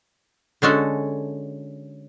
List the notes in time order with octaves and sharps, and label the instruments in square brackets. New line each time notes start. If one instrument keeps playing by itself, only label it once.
[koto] D3 G#3 C#4 F#4 A4